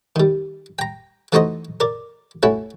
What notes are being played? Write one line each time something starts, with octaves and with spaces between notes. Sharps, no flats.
D#3 G3
G5 A#5
E3 A3 D#4 F#4 C5 D#5
A#4 D5
A3 C#4 E4 F#4